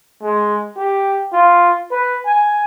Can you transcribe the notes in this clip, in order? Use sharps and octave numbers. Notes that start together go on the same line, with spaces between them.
G#3
G4
F4
B4
G#5